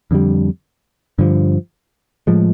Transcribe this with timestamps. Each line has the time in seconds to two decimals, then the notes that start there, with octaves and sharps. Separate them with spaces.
0.11 F2 D3 G3
1.18 G2 D3 F3
2.27 A2 F3 G#3